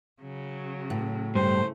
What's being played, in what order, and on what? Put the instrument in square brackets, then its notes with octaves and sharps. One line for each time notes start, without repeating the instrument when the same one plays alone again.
[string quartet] C#3 F#3
[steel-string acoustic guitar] A2
[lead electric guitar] G2 [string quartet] C#3 A3 [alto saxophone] C5